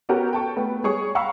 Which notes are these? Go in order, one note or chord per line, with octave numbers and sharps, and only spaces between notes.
B3 C#4 F#4 G4 A4 A#4
G5 A5 C#6
A3 B3 B4
G3 G#4 C#5 C#6
F5 F#5 A#5 B5 C#6 E6